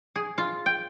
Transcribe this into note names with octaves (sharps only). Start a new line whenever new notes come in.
G#4
F4
G5